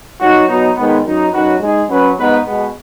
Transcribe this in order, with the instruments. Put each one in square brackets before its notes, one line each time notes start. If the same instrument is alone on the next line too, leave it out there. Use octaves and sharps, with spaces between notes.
[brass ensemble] F#3 D#4 F#4
B2 F#3 B3 D#4
G#2 D#3 G#3 B3
F#2 F#3 D#4
F#2 F#3 D#4 F#4 B4
G#3 D#4 G#4
F#3 C#4 B4
G#2 G#3 B3 D#4 B4
B2 G#3 B3